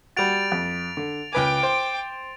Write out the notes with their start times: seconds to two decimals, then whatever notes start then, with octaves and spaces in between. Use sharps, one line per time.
0.17 G3 F#4 A6 D7 F7
0.52 F2
0.97 D3
1.33 C#2 B4 G5 G#5 D6
1.63 C5